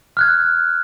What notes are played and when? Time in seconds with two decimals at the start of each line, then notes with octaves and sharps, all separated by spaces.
0.17 F6 F#6 G#6